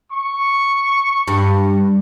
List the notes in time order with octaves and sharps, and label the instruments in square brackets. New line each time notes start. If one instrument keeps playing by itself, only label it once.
[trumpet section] C#6
[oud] G2